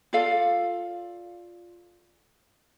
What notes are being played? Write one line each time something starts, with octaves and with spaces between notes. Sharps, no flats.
F4 A4 D5 F5